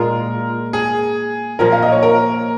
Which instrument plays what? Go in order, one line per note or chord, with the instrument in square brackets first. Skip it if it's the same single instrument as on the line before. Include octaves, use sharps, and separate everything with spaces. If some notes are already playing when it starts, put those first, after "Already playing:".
Already playing: [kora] A#2 G#3 F4 [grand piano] A#4
[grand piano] G#4
[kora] A#2 F3 A#3 [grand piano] A#4
[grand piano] F5
D#5
C#5
A#4